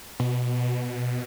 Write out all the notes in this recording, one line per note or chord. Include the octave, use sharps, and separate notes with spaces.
B2